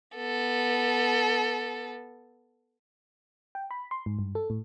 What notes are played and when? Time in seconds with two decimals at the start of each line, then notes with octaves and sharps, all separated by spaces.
0.16 B3 A4
3.55 G5
3.71 B5
3.91 C6
4.06 G#2
4.19 G2
4.35 A4
4.50 A2